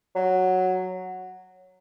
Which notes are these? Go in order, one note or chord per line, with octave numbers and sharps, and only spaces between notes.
F#3